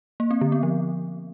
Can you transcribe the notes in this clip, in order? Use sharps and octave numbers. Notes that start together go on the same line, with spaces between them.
A#3
C4
D3
B3
F3